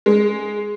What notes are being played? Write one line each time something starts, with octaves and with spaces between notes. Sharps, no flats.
G#3